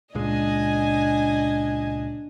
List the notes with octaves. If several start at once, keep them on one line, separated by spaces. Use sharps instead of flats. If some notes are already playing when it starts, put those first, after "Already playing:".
C#2 A#2 G#3 D4 D#5 G#5